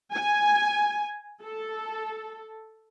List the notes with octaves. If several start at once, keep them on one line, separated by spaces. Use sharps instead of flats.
G#5
A4